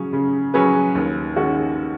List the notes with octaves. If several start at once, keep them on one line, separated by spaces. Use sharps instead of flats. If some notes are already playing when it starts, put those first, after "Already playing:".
Already playing: C#3 F#3 C#4 G#4
C#3
F#3 C#4 G#4 B4
D#2
D#3 G#3 C#4 F#4